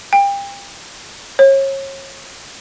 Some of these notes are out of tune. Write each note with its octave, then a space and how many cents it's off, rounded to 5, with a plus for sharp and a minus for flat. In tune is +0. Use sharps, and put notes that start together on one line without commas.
G5 +30
C#5 -30